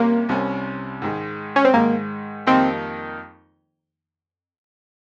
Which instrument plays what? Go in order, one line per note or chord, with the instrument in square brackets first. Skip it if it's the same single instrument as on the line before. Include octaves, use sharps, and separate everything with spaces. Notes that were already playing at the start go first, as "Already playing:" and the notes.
Already playing: [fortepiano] C3 G3 C#4 [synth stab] A#3
[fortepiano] C2 C3 G3 C#4
G#2 D#3 G#3
[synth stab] C#4
C4
[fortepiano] G#2 D#3 G#3 [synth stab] A#3
[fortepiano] F2 D#3 G3 A#3 D#4 [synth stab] C4